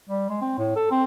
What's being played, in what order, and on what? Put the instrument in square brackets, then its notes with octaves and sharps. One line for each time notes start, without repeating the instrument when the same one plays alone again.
[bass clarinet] G3
G#3
C4
A2
A4
C4